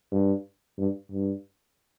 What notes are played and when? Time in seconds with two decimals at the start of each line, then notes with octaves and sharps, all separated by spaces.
0.12 G2
0.78 G2
1.11 G2